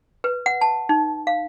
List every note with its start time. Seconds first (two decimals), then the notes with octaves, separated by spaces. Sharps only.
0.24 B4
0.46 F#5
0.61 A5
0.89 D#4
1.27 F5